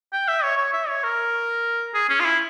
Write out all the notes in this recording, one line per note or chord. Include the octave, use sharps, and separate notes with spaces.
G5
E5
C#5
C#5
E5
C#5
A#4
G#4
C#4
F4
E4